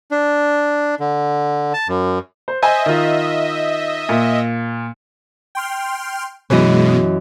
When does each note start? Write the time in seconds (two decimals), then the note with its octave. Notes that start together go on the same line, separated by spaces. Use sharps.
0.11 D4
1.00 D3
1.74 A5
1.88 F#2
2.48 C5
2.62 C5 D#5 E5 G#5
2.86 D#3 F4
4.09 A#2
5.55 G5 C6 F6
6.50 F#2 B2 E3 G#3 D#5